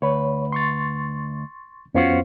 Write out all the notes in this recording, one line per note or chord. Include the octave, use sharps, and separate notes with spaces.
D2 B4 C#5
C6 C#6 A6
F2 B3 C#4 F4 F#4 C5